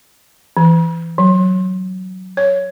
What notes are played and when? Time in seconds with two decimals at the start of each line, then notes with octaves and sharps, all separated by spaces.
0.57 E3
1.18 F#3
2.37 C#5